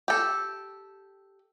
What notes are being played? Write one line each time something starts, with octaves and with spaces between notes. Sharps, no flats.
G4 A4